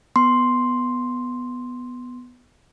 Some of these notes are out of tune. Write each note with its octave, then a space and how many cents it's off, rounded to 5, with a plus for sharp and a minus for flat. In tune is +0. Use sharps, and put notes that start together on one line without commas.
B3 +0 C6 +0